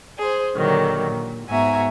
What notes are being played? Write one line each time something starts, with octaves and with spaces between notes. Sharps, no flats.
G#4 C5
A#2 D3 D#3 F#3 G3
A#2
G#2 B3 F#4 E5 G#5 A#5